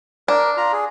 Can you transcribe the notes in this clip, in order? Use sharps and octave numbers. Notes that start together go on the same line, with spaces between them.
D4 A#4
F4 A#5
G#4